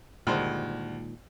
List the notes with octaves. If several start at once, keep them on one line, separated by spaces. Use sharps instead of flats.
D2 G2 A#2 D#3 G#3 C5